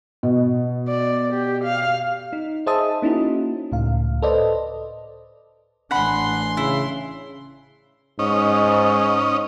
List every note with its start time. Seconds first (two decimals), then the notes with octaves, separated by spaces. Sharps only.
0.23 B2
0.89 D5
1.33 G4
1.64 F5
2.33 D#4
2.66 G#4 C5 D#5 E5 A5 D#6
3.02 A#3 C#4 D#4 E4 F#4
3.72 C#2 A2 F5
4.22 A4 B4 C5 D5 D#5
5.91 A1 D4 G#4 F#5 B5 C6
6.57 C#3 E4
8.19 G#2 C#4 D#5